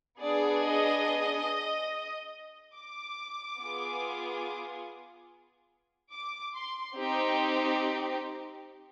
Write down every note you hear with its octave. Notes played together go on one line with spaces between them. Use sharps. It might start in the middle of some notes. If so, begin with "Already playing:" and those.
B3 D4 G#4 D5
D#5
D6
B3 F4 G#4
D6
C6
C4 D#4 G4